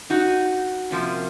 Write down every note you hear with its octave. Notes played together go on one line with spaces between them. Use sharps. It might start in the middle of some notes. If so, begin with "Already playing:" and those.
D#4 F#4
C3 F3 A#3 C#4